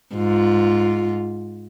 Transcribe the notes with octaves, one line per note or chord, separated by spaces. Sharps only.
G#2 F4